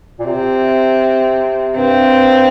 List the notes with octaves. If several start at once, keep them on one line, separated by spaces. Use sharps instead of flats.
A#2
C3 C4
G2 C4